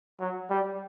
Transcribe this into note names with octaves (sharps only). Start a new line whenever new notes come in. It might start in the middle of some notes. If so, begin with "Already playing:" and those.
F#3
G3